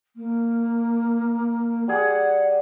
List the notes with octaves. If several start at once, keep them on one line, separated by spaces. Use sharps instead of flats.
A#3
G3 G#4 D5 F#5